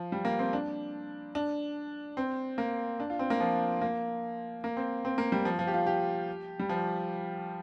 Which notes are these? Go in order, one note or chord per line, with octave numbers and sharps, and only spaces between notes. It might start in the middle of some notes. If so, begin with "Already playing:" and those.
Already playing: F3
G3
A#3
C4
D4
D4
C4
A#3
D4
F4
C4
A#3
F3
A#3
A#3
C4
C4
A#3
G3
F3
F3
G4
F4
G4
G3
F3